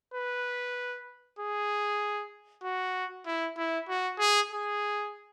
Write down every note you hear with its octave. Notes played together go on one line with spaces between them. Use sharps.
B4
G#4
F#4
E4
E4
F#4
G#4
G#4